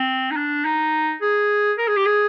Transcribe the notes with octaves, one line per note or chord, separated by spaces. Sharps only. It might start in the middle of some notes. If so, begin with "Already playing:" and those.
Already playing: C4
D#4
D4
D#4
G#4
A#4
G#4
G4
G#4